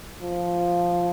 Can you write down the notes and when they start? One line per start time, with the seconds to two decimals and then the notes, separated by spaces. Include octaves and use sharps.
0.22 F3